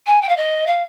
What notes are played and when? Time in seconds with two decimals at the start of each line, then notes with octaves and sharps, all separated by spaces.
0.06 G#5
0.21 G5
0.29 F5
0.37 D#5
0.67 F5